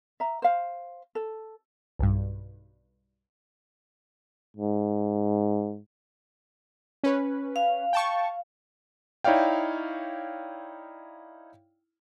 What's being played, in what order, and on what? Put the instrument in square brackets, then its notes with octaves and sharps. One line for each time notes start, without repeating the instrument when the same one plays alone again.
[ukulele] E5 A#5
C5 F5
A4
[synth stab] B1 G2
[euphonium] G#2
[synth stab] C#4 B4
[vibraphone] F5
[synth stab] G5 A5 C#6
[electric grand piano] D#4 E4 C#5 D5 F5 G5